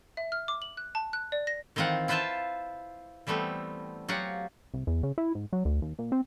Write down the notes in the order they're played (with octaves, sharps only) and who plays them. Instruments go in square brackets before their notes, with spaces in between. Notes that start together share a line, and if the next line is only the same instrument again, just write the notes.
[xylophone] E5
F6
D6
F#7
F#6
A5
F#6
D5
A#6
[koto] D#3 E3 C4 F4 F#5
E4 F4 B4 C5 E5 A5
E3 G3 A3 B3 C4
F#3 F4 G4 F#5
[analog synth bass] C2
E2
C#3
E4
G#2
F#3
D2
D#2
A#2
C4